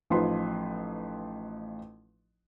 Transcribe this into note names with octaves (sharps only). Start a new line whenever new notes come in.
A1 F3 D#4 F4 B4 C6